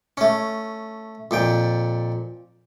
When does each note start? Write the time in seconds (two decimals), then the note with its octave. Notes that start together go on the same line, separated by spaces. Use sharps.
0.17 A3 C#4
1.31 F2 A#2 G5